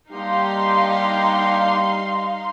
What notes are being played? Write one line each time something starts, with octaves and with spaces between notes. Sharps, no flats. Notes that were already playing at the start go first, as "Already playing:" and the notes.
G3 A#3 D4 D#4 G4 F5 C6